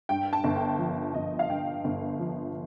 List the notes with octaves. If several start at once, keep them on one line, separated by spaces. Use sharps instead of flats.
G2 G5
A5
G1
G5
F3
G1 D#5
F5
G2 G5
G1
F3